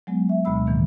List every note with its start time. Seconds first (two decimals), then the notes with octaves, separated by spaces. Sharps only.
0.07 F#3 G#3 B3
0.29 E5
0.45 D2 B2 G#3 B5 E6
0.67 A2 D#3 E3 A#3